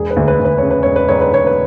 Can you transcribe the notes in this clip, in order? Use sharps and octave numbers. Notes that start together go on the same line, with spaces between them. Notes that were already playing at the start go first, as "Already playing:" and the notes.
Already playing: E1 G#4
B4
D2
B4
D2
B4
C#3 C#5
B4
E1 C#5
B4
E1 C#5
B4
E1 C#5
B4